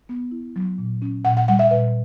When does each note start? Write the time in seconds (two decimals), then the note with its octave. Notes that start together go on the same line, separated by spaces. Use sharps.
0.09 B3
0.32 E4
0.56 F#3
0.78 A#2
1.02 C#4
1.25 A#2 F#5
1.37 F#5
1.48 G3 F#5
1.59 E5
1.71 A#2 B4